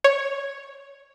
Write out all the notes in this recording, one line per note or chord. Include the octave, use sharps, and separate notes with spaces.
C#5